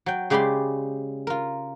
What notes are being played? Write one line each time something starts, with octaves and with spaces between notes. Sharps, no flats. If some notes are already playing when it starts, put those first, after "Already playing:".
F#3 G5
C#3 G#3 G4 D5 B5 C6
F4 A#4